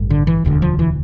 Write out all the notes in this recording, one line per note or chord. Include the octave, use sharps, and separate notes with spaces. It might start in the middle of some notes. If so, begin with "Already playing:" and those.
Already playing: A1 G2
D3
E3
E1 D2 D3
F3
E3